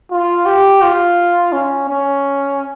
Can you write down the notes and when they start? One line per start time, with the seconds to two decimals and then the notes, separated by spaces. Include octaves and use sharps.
0.11 F4
0.46 G4
0.82 F4
1.53 C#4
1.88 C#4